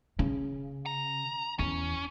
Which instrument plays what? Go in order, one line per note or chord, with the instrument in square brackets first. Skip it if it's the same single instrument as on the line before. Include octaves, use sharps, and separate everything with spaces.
[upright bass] C#3
[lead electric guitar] A#5
[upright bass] E2 [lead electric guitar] C#4